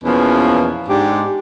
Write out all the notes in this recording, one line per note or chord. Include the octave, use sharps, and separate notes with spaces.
E2 B2 E3 F3 A#3 C#4
G#2 D4 G4